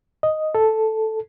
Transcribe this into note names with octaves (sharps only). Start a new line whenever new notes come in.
D#5
A4